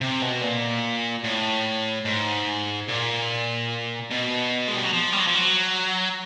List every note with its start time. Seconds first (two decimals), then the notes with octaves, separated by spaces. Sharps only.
0.01 C3
0.22 B2
0.41 A#2
1.24 A2
2.05 G#2
2.88 A#2
4.11 B2
4.68 G#3
4.75 G3
4.84 F#3
4.93 F3
5.12 G3
5.20 F#3
5.27 F3
5.35 F#3